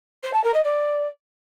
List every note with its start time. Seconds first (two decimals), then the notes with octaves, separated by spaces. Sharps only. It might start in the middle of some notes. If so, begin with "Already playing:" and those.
0.23 C5
0.33 A5
0.44 A#4
0.54 D#5
0.64 D5